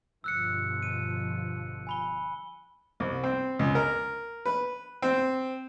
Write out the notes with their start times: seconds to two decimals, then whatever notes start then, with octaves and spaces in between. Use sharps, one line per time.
0.24 G1 B2 F3 E6 F#6 C#7
0.83 D#7
1.87 G#5 B5 G7
3.00 C2
3.24 C4
3.59 C#2
3.75 A#4
4.46 B4
5.02 C4